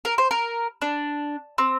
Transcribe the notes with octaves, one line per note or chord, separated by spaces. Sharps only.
A#4
C5
A#4
D4
C4